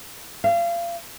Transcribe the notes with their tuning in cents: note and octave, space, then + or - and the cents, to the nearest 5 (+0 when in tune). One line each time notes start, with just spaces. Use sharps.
F5 -30